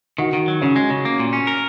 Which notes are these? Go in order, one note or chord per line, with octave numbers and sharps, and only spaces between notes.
D#3 F#4
D#3
F#3
C#3 C#4
G#3
C#3
A#3
A#2
C#4
A#4